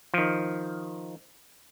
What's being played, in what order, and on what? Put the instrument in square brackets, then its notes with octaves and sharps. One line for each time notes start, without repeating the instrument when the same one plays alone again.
[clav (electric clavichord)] D#3 F3